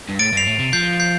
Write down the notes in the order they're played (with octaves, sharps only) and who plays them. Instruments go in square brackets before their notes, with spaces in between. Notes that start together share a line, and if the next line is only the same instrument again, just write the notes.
[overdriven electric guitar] G2
[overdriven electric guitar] A2 [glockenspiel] A6 D7
[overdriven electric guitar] G2
[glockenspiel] C7 F7
[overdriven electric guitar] A2
C3
[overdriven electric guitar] F3 [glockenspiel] G6 C7
[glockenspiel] G6 C7